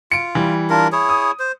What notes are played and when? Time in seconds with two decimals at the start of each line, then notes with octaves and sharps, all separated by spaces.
0.12 F4 C#7 D7
0.35 E3 G3
0.70 D4 F4 A#4
0.92 E4 G#4 C#5
1.09 D#6
1.39 C5